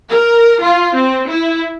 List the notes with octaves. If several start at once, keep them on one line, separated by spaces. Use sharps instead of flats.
A#4
F4
C4
E4